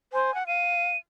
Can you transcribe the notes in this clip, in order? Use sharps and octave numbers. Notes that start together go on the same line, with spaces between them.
C5 G#5
F#5
F5 D#7